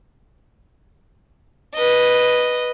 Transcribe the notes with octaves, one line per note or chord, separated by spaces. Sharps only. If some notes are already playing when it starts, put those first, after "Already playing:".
B4 D#5